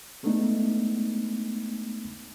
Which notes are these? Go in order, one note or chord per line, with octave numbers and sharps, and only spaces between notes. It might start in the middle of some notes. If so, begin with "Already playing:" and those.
G#3 A3 B3 D4 D#4